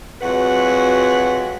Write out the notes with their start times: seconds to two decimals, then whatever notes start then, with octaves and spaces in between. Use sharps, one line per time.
0.21 F2 F#3 G#3 F#4 B4 F#5